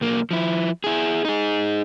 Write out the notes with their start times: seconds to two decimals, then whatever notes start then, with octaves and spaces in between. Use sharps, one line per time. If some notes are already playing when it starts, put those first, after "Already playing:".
0.01 B1 A#3
0.31 F3 E4
0.84 E4 G#4
1.25 D#4 G#4